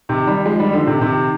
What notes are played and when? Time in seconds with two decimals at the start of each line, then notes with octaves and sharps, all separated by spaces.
0.09 C3 D#3
0.27 D#3 G3
0.46 F3 G#3
0.60 D#3 G3
0.73 D3 F3
0.87 C3 D#3
1.01 C3 D#3